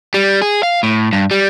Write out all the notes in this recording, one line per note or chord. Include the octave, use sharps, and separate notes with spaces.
G3
G#4
F5
A2
G2
G3